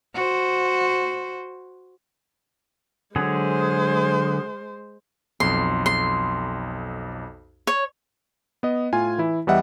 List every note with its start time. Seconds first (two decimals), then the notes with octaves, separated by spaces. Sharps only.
0.14 F#4 C5
3.16 D3 F#3 G#3 G#4 C5
5.40 B1 F2 C6
5.86 C6
7.67 C#5
8.63 B3 D#5
8.93 A2 F4 G#5
9.18 E3 E4
9.47 E2 E3 G3 D#5 E5 F#5